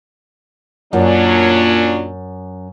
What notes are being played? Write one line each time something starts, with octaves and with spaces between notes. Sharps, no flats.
F#2 A#2 F#3 C#4 D4